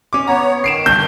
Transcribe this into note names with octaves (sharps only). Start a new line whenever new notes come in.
C#4 D6
B3 C#5 A#5
D#3 C7 D7 E7
G1 G2 G6